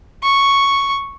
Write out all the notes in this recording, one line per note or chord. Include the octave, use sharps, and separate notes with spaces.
C#6